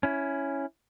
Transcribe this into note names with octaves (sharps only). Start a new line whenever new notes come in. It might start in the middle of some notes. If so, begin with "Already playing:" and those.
C#4 E4